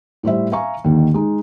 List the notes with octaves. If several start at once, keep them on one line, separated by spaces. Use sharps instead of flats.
A2 G3 C5 E5
E5 F5 G#5 A#5 C#6
D#2 D3 D#3
G#3 D#4